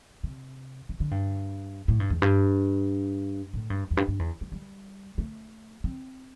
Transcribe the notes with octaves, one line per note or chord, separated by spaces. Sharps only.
C3
D3
D3
G2
A2
G2
E2
G2
A2
G2
E2
G2
G2
E2
G3
G3
A3
C4